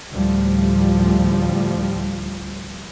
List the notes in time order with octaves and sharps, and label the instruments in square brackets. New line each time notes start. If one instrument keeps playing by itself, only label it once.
[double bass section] D2 A2 F3 G3